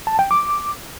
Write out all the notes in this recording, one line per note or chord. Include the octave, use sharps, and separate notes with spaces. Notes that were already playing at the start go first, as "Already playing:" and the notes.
A5
G5
D6